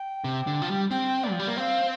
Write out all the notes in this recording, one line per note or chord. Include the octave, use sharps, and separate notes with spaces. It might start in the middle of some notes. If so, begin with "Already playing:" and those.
Already playing: G5
C3
D3
F3
G3
C4 G5
D5
F3
G3
A#3
C4 F5 G5